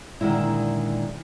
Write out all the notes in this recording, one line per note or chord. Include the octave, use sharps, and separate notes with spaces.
A#2 D3 D#3 G#3 E4